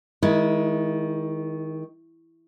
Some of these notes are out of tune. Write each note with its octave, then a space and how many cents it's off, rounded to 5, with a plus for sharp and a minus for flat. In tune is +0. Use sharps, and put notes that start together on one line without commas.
D#3 +25 G#3 +0 E4 +0